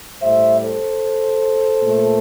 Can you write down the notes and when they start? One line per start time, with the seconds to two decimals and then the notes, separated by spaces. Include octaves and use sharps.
0.22 A2 G3 C5 E5
0.61 A4 C5
1.82 A#2 A3